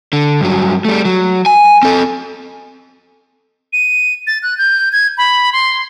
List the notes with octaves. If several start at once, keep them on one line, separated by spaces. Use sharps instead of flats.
D3
G2 F#3
G3 A3
F#3
G#5
C4 A4
D#7
A6
F#6
G6
G#6
B5
C6